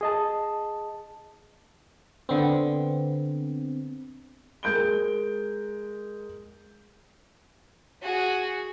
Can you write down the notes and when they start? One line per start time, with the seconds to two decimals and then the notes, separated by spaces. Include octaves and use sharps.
0.01 G#4 D#5 A5
2.29 D3 B3 C4
4.63 G#3 A#4 G6 D7 G7
8.02 F#4 G#4